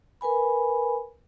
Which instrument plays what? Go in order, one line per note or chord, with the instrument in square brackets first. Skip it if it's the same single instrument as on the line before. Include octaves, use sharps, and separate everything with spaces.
[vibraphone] A#4 B4 G#5 B5